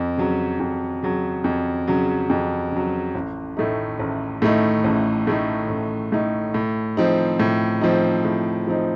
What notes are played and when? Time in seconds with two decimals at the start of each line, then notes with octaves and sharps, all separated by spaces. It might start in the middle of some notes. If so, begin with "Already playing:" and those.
Already playing: F2
0.18 C#3 F#3
0.60 F2
1.03 C#3 F#3
1.44 F2
1.88 C#3 F#3
2.30 F2
2.72 C#3 F#3
3.15 A1
3.57 A2 A3 D#4
3.99 A1
4.42 A2 A3 D#4
4.84 A1
5.27 A2 A3 D#4
5.69 A1
6.12 A2 A3 D#4
6.54 A2
6.97 F3 C4 D#4
7.39 A2
7.81 F3 C4 D#4
8.25 A2
8.67 F3 C4 D#4